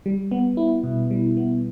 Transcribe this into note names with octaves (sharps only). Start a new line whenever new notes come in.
G3
B3
E4
B2
G3
B3